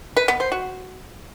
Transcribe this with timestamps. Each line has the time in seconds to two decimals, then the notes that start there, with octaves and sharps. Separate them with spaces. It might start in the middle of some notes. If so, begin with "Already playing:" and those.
0.17 B4
0.28 B3
0.40 C5
0.52 F#4